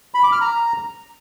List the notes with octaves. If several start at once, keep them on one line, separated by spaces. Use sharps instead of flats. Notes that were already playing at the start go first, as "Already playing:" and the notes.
B5
D6
F6
A#5